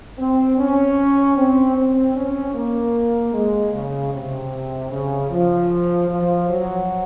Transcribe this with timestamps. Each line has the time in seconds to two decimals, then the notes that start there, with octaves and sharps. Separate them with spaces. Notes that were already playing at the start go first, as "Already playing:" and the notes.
0.19 C4
0.58 C#4
1.37 C4
1.76 C4
2.15 C#4
2.55 A#3
3.33 G#3
3.73 C#3
4.12 C3
4.91 C#3
5.30 F3
6.09 F3
6.48 F#3